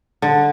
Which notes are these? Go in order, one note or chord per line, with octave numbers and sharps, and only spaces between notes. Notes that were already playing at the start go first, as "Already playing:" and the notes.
D3